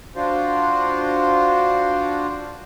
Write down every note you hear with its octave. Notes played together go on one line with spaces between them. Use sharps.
D4 F4 F#4 C5